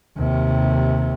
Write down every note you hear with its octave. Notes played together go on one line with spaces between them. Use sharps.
D#2 C3